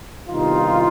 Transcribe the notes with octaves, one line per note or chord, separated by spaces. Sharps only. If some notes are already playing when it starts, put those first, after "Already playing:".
E2 C3 D#3 G3 D#4 F4